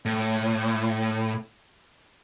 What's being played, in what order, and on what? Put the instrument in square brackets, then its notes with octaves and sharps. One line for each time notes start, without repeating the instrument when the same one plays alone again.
[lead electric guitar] A2